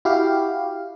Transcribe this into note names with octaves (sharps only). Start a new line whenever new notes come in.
E4 F#4 G4 F5